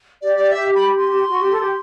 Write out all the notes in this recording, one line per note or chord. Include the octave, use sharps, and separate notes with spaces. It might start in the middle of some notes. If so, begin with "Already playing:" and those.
G4 D5
D5
E5
B5
C6
G4
F#4
G4
A4
G4